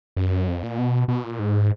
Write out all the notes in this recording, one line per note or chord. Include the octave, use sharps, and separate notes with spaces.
F#2
F2
A#2
B2
B2
A#2
G#2